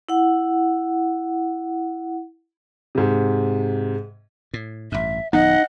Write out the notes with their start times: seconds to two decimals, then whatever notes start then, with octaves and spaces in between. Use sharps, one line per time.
0.09 E4 F#5
2.95 G#2 C3
4.54 A2
4.92 A1 G2 E5
5.33 D1 F3 B3 D#4 D#5 F#5